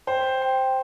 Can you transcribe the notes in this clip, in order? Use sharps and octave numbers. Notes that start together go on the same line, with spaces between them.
C5 G5
G5